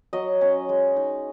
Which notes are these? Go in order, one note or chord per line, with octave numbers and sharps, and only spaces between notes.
F#3 D#5
C#4
G#3
D#4